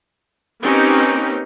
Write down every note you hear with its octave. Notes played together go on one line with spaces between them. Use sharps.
A#3 C4 C#4 D#4 G4 B4